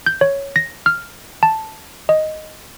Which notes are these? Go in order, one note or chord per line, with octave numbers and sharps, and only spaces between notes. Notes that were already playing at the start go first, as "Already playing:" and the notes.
G6
C#5
A#6
F6
A5
D#5